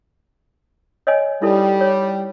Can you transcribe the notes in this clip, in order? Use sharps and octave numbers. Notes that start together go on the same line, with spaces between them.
C#5 D#5 G#5
G3 D#4 E4 A4
C#5